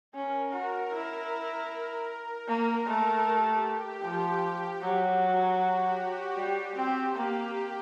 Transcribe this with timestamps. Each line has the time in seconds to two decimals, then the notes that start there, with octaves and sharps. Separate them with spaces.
0.13 C#4 A#4
0.52 F#4
0.92 E4
2.47 A#3 A#4
2.87 A3 A4
3.26 G4
4.03 F3
4.81 F#3 F#4
5.21 F#4
5.59 G4
6.37 G3
6.76 C4
7.15 A#3 G4